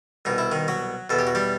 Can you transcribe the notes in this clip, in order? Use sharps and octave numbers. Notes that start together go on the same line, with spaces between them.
C2 B2 D#4
E4
D#3 D#4
F#3 F#4
E2 B2 A4
G4
F#4
G3 G4